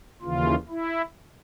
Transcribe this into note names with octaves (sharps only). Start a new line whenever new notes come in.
D#2 C#3 E3 F4
E4